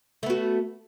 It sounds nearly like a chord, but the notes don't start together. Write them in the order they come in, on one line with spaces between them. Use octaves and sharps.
A3 B3 F#4